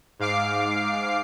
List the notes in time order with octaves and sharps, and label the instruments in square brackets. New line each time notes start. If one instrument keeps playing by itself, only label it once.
[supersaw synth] G#2 F5 D6 C7